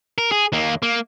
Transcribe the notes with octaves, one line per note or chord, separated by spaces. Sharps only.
A#4
G#4
D#2 A#3
A#3